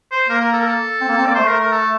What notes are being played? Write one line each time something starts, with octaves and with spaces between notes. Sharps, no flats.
C5
A#3 A#4
A#4
A4
A#4
A4
C4
A#3
C4
A#3 D5
A3 C5
A#4
A#4
A4